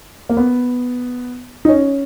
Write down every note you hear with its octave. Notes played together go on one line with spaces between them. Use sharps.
A#3
B3
D#4
C#4